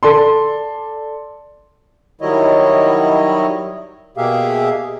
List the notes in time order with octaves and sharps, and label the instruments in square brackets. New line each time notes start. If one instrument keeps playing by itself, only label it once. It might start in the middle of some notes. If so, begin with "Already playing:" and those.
[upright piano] A4 D5 C6
[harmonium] D#3 F#3 G3 E4 C#5 D#5
B2 A#3 G4 G#4 E5 F5